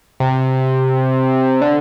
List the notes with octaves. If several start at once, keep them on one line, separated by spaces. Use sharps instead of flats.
C3
D3